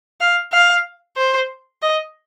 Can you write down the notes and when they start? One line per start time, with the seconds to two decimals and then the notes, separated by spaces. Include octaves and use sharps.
0.21 F5
0.52 F5
1.17 C5
1.82 D#5